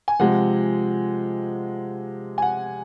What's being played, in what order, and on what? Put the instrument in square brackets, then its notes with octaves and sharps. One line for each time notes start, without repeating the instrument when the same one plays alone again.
[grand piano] G#5
C3 F3 G#3 F#5
G#5
F#5